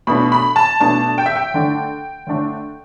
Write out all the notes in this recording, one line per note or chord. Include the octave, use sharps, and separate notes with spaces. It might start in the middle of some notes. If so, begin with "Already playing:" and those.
B2 A3 D4 B5
B5
A5
B2 A3 D4 A5
G5
E5
G5
D3 A3 D4
D3 A3 D4